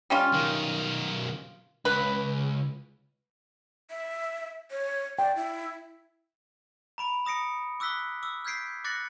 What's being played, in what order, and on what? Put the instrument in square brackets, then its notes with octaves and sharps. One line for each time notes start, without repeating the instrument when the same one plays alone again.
[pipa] G3 C#4 F4
[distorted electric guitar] B1 D#3
[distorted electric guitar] C#2 [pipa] B4
[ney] E5
C#5
[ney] D5 [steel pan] G5
[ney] E4
[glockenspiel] A#5 B5 D7
A#5 D#6 A#6 C#7 D7
D6 E6 F#6 B6 G7
D6 E6 F6
F6 G6 G#6 B6 C7 D7
D6 F#6 A6 A#6 C#7 F#7